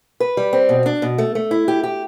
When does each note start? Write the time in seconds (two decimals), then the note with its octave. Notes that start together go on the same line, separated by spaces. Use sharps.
0.20 B4
0.37 G3
0.53 C4
0.69 B2
0.86 D4
1.02 B2
1.18 A3
1.35 A3
1.51 E4
1.68 G4
1.83 G4